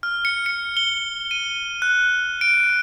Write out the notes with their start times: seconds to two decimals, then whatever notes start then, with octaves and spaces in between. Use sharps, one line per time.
0.03 F6
0.25 C#7
0.46 C#7
0.77 G7
1.31 D#7
1.82 F#6
2.41 D7